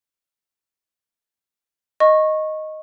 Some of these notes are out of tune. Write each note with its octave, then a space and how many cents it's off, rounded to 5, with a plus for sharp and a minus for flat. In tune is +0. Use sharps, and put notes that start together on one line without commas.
D#5 +0 C#6 -20